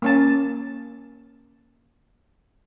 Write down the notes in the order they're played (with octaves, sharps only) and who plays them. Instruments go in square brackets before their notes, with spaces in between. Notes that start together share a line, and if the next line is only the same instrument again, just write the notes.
[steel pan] A#3 C#4 A5